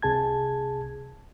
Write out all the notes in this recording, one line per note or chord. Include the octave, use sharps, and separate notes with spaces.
C2 C3 G#4 A5 G#6